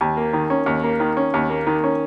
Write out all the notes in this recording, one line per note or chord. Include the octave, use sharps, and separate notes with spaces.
D#2
A#3
D#3
C#4
D#2
A#3
D#3
C#4
D#2
A#3
D#3
C#4